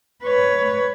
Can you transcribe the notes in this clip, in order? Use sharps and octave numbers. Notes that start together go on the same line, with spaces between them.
B4 C#5